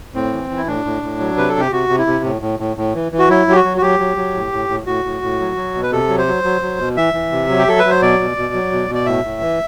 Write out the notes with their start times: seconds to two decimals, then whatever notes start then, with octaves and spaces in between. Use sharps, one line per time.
0.14 A2 C4
0.32 E3
0.50 E3
0.57 E4
0.67 A2 D4
0.85 A2
1.02 A2
1.19 F#3
1.37 C3 B4
1.49 A4
1.55 C3 G4
1.71 C3 F#4
1.89 C3
1.98 E4
2.07 C3
2.24 A2
2.41 A2
2.59 A2
2.77 A2
2.94 E3
3.12 E3
3.19 F#4
3.29 F#3 E4
3.47 F#3 G4
3.56 F#4
3.64 F#3
3.77 F#4
3.82 F#3 G4
3.99 F#3
4.17 F#3
4.34 A2
4.52 A2
4.69 A2
4.86 A2 F#4
5.04 A2
5.22 A2
5.40 F#3
5.56 F#3
5.74 B2
5.83 B4
5.92 C3 A4
6.09 F#3
6.18 C5
6.27 F#3
6.43 F#3
6.61 F#3
6.79 B2
6.97 E3 E5
7.13 E3
7.32 C3
7.49 F#3
7.58 G4
7.67 F#3 A4
7.79 B4
7.85 F#3
7.91 C5
8.02 B2 D5
8.19 B2
8.37 B2
8.54 F#3
8.72 B2
8.88 B2
8.95 D5
9.06 A2 E5
9.24 A2
9.41 E3